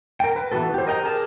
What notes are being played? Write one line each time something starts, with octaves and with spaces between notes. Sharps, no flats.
A#4 G5
B4
E3 B3 F#4 A4
G4 C5
A#4 D#5 G5 A#5
G4 G#4 A#4 A5